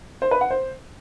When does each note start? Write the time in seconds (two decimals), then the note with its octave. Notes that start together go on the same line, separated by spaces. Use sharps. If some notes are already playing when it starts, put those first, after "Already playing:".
0.22 C5
0.31 B4
0.41 F#5
0.51 C5